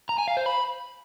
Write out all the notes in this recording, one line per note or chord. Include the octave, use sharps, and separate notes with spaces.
A#5
G#5
F5
C5
B5